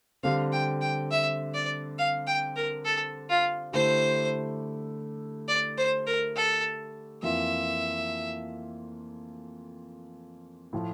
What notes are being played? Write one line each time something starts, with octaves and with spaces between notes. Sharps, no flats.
D3 G3 C4 F5
G5
G5
E5
D5
F5
G5
A#4
A4
F4
D3 A3 E4 G4 C5
D5
C5
A#4
A4
F2 E3 A#3 F4 E5
A2 F3 A3